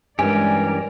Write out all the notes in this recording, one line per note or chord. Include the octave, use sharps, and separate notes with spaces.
G2 E3 G#3 C#4 G4 A#4 D5 G#5